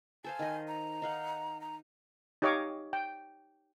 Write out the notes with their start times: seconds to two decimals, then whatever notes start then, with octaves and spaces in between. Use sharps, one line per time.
0.24 A4 C5 F5 G#5
0.39 D#3 D#5
0.68 A#5
1.02 D#4 F5 F#5
1.61 A#5
2.42 D#4 G4 C#5 D#5 F5 D6
2.93 G5